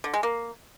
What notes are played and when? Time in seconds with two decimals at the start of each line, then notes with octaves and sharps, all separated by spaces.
0.04 D3
0.14 G#3
0.23 A#3